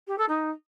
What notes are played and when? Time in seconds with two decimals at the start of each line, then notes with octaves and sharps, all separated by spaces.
0.07 G4
0.18 A4
0.28 D#4